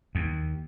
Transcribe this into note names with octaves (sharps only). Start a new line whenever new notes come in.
D#2